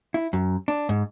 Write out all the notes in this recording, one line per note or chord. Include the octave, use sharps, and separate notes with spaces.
E4
F#2
D4
G#2